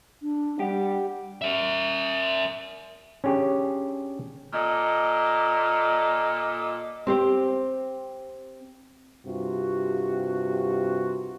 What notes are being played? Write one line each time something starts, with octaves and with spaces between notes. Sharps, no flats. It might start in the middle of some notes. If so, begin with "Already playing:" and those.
D4
G3 G4 F#5
A#4 E5
C#4 D4 G4 G#4
A#2 A4 D5 D#5
C4 G4 C5
G2 C3 F4 F#4